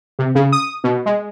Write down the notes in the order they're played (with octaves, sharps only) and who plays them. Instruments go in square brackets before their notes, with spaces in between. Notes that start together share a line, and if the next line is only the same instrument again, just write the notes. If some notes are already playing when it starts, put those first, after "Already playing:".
[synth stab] C3
C#3
D#6
B2
G#3